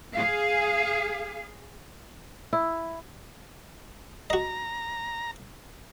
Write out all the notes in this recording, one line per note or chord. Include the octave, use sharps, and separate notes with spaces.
G#4 F5
E4
F#4 D#5 A#5